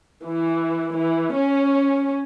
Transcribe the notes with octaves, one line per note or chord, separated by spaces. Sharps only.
E3
E3
C#4